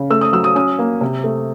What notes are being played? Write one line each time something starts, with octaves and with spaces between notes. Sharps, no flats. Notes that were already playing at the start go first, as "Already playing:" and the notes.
Already playing: C#3
A3 E6
D#6
F#3 E6
D#6
C#4 D#6
A#3
C3
A3